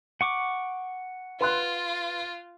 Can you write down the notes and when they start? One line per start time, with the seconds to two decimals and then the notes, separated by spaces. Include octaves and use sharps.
0.21 F#5 C#6 D6
1.41 F4 B4 C6 F#6